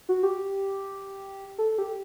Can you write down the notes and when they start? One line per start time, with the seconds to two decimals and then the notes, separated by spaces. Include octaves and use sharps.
0.09 F#4
0.23 G4
1.58 A4
1.78 G4